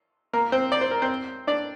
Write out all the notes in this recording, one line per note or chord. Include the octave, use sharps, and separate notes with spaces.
A#3 A#4
C4 C5
D5
C5
A#4
C4 C5
D4 D5